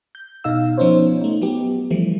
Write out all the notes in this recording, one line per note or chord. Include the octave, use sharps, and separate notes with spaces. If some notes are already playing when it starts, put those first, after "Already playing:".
G6
B2 D#4 F5 E6
F3 B3 C#4 D#4 C5 C#5
A3 D#4
F#3 B3 G4
E3 F3 G3 A3